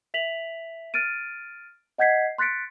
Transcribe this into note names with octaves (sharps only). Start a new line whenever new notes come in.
E5 B6 F7 F#7
F6 A6 D7 D#7
D#5 F#5 G6 G#6 B6 C7
C6 F#6 A6 B6 C#7 D7